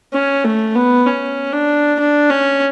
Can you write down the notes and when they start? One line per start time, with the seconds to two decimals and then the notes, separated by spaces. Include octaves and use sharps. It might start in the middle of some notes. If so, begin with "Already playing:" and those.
0.14 C#4
0.44 A3
0.75 B3
1.07 C#4
1.53 D4
1.99 D4
2.30 C#4